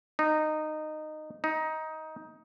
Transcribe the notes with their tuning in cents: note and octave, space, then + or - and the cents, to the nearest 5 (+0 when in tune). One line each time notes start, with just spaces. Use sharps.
D#4 -15
D#4 +15